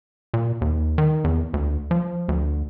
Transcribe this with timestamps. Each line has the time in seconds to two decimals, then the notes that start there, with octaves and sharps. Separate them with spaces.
0.34 A#2
0.61 D#2
0.98 D#3
1.24 E2
1.53 D2
1.91 F3
2.28 D2